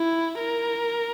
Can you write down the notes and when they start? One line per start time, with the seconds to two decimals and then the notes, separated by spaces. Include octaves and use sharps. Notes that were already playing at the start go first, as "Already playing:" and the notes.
Already playing: E4
0.39 A#4